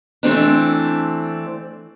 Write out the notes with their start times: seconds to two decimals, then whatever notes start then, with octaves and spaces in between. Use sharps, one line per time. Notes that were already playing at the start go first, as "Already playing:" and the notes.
0.23 E3 A3 C4 D4